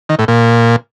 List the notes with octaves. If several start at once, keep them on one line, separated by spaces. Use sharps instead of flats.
D#3
A2
A#2